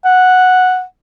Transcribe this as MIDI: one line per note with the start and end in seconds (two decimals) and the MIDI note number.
0.05 0.83 78